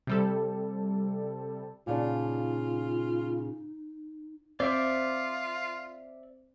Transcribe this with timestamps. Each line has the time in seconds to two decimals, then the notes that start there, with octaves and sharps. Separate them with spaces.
0.07 C3 G3 A4
1.87 A#2 C#3 D4 D#4 F4
4.60 C4 F4 C5 D5 E5 D6